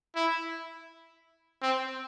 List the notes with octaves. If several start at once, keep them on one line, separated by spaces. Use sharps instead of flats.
E4
C4